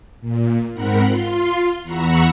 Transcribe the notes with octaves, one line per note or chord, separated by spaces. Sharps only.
A#2
G#2 C4 A#4 F#5 B5
F4 C6
E2 F#5 A#5 B5 C#6 E6